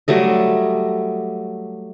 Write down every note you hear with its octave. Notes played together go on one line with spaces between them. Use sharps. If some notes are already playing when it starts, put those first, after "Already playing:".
F#3 G3 A3 D#5